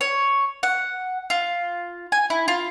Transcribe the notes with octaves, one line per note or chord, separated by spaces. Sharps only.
C#5
F#5
F4
G#5
E4
F4